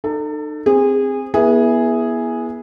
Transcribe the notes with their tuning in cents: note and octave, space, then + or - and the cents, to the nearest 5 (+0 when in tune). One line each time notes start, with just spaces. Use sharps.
D#4 -40 A4 +20
C4 +0 G#4 -25
B3 -30 E4 +0 G#4 +0